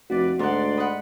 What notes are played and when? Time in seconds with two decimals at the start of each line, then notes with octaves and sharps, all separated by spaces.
0.10 F1 F#4 B4 D5
0.39 D2 G#2 D5 F#5 C6
0.77 F#5 B5 D#6